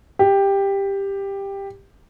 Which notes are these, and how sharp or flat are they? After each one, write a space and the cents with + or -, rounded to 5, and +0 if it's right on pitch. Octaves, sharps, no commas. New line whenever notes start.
G4 +10